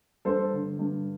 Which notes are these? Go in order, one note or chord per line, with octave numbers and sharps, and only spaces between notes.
G2 A4 C5
D3
G2